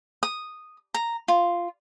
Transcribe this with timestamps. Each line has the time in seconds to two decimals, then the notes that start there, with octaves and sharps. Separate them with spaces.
0.23 D#6
0.94 A#5
1.28 F4